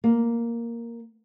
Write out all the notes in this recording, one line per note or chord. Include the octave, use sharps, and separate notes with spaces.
A#3